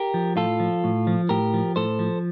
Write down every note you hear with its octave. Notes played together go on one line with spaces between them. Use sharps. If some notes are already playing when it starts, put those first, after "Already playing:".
Already playing: G4 A#4
F3
A2 F4 A4
F3
A2
F3
A2 G4 A#4
F3
A2 A4 C5
F3